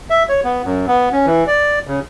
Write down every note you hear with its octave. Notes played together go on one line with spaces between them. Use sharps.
E5
C#5
B3
F#2
B3
C#4
E3
D5
C#3